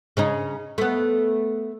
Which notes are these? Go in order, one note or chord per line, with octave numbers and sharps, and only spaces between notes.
C#3 C#4 D#4
A3 B3